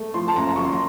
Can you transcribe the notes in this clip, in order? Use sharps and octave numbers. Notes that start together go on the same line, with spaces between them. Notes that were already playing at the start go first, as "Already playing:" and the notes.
Already playing: A3
F3 C6
A5
F#1 A#5
F#2 C#6
C6
A#5